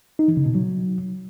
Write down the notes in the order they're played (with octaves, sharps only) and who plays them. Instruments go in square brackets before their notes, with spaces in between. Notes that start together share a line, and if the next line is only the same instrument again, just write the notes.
[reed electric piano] D#4
E3
C#3
B2
F#3